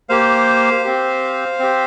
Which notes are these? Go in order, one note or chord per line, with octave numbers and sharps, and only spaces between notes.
A#3 G4 C5 F5
C4 G4
C4 G4